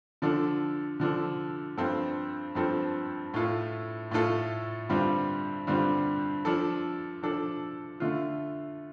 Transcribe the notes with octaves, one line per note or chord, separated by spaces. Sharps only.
D3 F3 D4 A4
D3 F3 D4 A4
G2 F3 C4 A4
G2 F3 C4 A4
A2 A3 F4 A4
A2 A3 F4 A4
G2 D3 G3 C4 F4
G2 D3 G3 C4 F4
F3 D4 A4
F3 D4 A4
D3 A3 F4